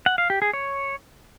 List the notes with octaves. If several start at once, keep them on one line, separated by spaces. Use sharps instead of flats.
F#5
F5
G4
G#4
C#5